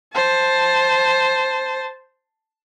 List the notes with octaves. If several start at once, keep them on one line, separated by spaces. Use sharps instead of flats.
C5 A5